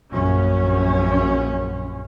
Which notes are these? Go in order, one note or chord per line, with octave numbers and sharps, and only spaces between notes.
A#1 F#2 C#4